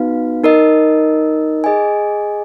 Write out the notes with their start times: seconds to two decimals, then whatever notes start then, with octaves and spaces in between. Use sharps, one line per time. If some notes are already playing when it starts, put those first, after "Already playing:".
Already playing: B3 D#4 F#4 B4 F5
0.44 D#4 A#4 D#5
1.64 G#4 D#5 G#5